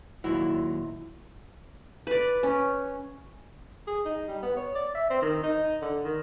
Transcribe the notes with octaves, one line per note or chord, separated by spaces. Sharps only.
D#2 A#2 F#3 E4
B4 D5
C#4
G#4
D#4
G3
B3
C#5
D5
E5
C4
D#3
D#4
D3
D#3